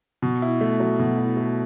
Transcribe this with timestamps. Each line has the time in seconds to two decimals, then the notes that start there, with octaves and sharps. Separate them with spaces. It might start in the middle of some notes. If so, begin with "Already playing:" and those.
0.22 B2
0.42 E4
0.61 A3
0.80 F#3
0.99 B2
1.18 E4
1.37 A3